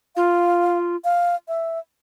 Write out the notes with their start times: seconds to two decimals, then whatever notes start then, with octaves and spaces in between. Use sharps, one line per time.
0.16 F4 F5
1.04 F5
1.48 E5